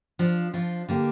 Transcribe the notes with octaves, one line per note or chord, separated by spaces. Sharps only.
F3 D4 F4
F3 D4 F4
D3 A#3 G4